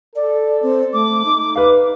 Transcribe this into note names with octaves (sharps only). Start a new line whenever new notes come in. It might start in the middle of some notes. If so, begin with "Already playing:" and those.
A4 D5
C4
A3 D6
D#4
B4 F5